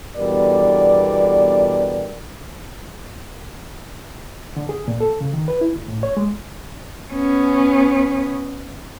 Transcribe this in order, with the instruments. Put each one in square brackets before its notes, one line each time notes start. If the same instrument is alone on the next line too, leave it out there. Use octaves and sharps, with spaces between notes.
[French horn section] E2 B2 D3 G3 A#4 D5
[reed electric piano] D3
G#4
A#2
A4
C#3
D#3
B4
E4
D2
A2
C#5
G#3
[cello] B3 C#4